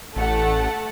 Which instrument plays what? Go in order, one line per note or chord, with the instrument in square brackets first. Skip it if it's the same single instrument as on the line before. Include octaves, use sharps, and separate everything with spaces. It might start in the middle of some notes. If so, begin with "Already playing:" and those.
[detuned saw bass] A1 [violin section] A3 F#5 A5